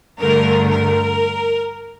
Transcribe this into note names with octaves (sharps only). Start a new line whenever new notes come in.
G2 D3 A3 A#4
A#4